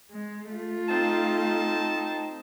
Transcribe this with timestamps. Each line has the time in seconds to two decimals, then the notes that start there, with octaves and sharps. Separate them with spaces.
0.11 G#3
0.52 A3 F4
0.89 C4 D#4 A5